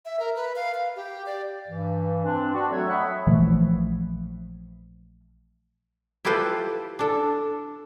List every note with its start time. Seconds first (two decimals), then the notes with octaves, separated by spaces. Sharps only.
0.05 E5
0.20 A#4
0.36 B4
0.56 F5
0.74 F5
0.96 G4
1.26 D5
1.68 G2 E3
2.25 C4 D4
2.54 D4 F#4 D5
2.70 F#3 A3 C4 A4 C#5 E5
2.89 C#5 D#5 E5 F#5 B5
3.27 A#1 E3 F3 A3
6.25 E4 F4 G4 A4 B4 C5
6.99 D4 A4